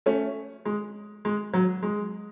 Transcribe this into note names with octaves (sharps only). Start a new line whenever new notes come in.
A3 C#4
G#3
G#3
F#3
G#3